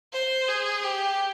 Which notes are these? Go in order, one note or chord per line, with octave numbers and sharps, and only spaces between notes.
C5
G#4
G4